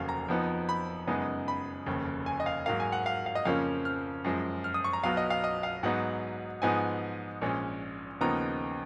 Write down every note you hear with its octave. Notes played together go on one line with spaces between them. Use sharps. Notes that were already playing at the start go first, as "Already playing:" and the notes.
Already playing: F1 D#2 C#3 F#3 A#3 F5
A#5
F2 F3 B3 D#4
B5
F#2 C#3 G#3 B3 D#4
B5
F1 D#2 C#3
G#5
D#5
F5
G#2 F#3 A#3 F5
G#5
F#5
F5
F5
D#5
F2 C#3 F3 A#3 C#4 F5
F6
F#2 F3 G#3
F6
D#6
C#6
A#5
B1 B2 F#3 B3 F5
D#5
F5
D#5
F5
G#2 F#3 B3 D#4 F#5
G#2 F3 G#3 B3 D#4 G#5
A#1 A#2 G#3 C#4
D#2 C#3 F3 B3 D#4 A#5